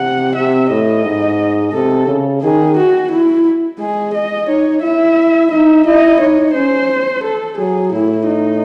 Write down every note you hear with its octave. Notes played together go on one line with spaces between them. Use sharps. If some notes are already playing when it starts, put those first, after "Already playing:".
Already playing: C3 F#5
C3 E5
A2 D#5
G#2
C3 A4
C#3
D#3 G#4
F#4
E4
G#3 G#4
D#5
D#4 C#5
E4 E5
D#4 E5
E4 D#5
D#4 C#5
C#4 C5
A4
F#3 G#4
A2 E4
D#4